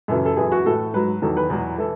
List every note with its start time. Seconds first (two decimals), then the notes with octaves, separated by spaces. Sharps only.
0.08 F#2 C#3 E3 A4
0.25 A4
0.37 F#2 E3 G#4
0.52 F#4
0.66 A2 E3 A4
0.93 G#2 F#3 B4
1.22 E2 D#3 F#3 A4
1.37 B4
1.50 E2 B2 F#3
1.78 E3 A4